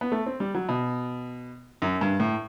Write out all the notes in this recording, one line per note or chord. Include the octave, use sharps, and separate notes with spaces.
B3
A3
C4
G3
F#3
B2
F#2
G2
A2